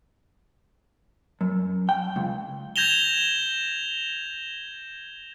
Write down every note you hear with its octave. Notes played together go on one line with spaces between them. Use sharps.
F#2
G5
C#2
G6 G#6 A#6 E7 F7 G7